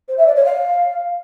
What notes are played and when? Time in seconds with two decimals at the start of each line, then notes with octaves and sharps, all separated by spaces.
0.08 C5
0.17 E5
0.26 D5
0.36 C#5
0.45 F5